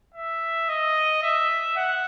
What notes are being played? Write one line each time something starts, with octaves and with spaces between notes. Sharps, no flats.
E5
D#5
E5
F#5